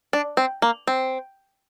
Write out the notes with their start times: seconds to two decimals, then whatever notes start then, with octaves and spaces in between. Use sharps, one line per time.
0.13 D4
0.37 C4
0.62 A#3
0.87 C4